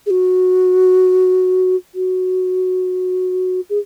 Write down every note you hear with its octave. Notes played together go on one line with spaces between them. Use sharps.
G#4
F#4
F#4
G#4